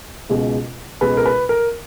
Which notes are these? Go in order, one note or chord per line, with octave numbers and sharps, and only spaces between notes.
C#2 B2 G#3
C#2 B2 G#3 B4
A#4
B4
A#4